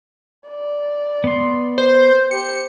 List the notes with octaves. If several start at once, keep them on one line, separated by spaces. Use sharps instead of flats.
D5
B3 C6
C5
G4 C5 C#7